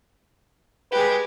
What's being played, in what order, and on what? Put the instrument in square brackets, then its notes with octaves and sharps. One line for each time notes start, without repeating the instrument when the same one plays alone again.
[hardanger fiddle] G#3 G4 [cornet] B4